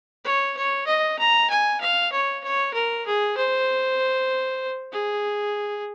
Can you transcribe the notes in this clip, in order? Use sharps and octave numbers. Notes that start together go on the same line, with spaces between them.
C#5
C#5
D#5
A#5
G#5
F5
C#5
C#5
A#4
G#4
C5
G#4